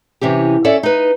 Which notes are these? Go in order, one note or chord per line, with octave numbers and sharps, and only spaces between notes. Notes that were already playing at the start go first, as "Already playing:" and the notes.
C3 E3 C#4 G4
C#4 A4 D5 E5
D#4 B4